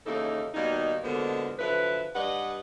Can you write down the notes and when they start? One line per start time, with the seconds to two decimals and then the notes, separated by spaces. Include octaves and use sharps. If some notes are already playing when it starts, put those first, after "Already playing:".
0.06 D#2 C#3 E3 A#3 D#4 A4
0.55 B2 D#3 G3 A#3 D#4
1.03 B2 D3 F3 G#3 A#3 B3
1.59 D3 F3 F#3 E4 B4
2.15 G2 B4 D5 D#5 F#5